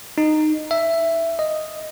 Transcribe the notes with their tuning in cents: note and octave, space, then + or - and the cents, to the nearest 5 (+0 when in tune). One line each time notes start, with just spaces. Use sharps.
D#4 -15
E5 +10
D#5 +0